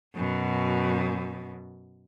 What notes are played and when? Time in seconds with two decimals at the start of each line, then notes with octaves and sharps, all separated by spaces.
0.15 F#2 B2